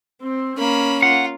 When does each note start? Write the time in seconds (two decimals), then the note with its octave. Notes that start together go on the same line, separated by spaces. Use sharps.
0.22 C4
0.58 A#3 C#4 B5
1.02 F4 F#5